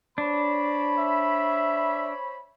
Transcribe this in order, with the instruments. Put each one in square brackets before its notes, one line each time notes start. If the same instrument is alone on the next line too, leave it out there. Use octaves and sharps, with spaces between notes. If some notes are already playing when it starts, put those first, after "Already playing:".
[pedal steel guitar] D4 [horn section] C5 C#5 B5
[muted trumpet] E5